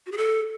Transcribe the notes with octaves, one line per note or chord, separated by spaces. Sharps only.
F#4
G#4
A4